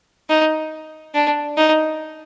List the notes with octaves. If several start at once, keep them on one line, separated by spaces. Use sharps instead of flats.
D#4
D4
D#4